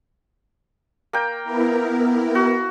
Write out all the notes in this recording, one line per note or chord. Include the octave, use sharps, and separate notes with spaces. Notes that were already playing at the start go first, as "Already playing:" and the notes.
A#3 G5
B3 E4 A#4
F#4